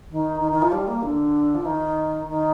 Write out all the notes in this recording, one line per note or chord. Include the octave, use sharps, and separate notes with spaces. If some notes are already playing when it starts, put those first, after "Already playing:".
D#3
D#3
D#3
F3
G3
A#3
D3
F3
D#3
D#3